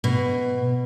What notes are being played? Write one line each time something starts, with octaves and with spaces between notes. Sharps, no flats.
B2